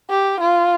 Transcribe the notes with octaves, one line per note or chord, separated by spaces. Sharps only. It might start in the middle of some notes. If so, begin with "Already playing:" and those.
G4
F4